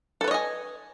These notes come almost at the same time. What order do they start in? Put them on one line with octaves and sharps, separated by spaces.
A4 B4 C#5 D#5 G#5